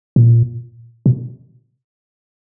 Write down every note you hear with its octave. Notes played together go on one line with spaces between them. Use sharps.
A#2
B2